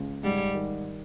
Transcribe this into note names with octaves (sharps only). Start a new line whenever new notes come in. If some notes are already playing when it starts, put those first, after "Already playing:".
Already playing: C#2
G#2 G3
D#3